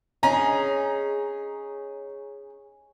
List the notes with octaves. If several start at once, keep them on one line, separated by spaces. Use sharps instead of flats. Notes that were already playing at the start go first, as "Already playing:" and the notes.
C#4 D#4 G#4 A#5